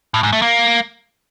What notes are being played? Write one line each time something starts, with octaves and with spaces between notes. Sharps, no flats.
A2
G#2
A3
A#3